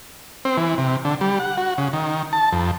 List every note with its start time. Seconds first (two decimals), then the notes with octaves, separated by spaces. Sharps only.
0.45 C4
0.57 E3
0.78 C3
1.05 D3
1.21 G3
1.40 F#5
1.57 F#4
1.78 C#3
1.93 D#3
2.33 A5
2.53 F2